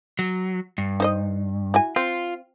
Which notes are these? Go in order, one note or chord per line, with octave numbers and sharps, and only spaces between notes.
F#3
G2
D#4 C5 D#5
E4 F#4 G#5
C4 F4